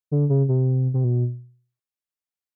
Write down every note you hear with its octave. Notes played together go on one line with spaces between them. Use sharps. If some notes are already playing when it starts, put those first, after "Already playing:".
D3
C#3
C3
C3
B2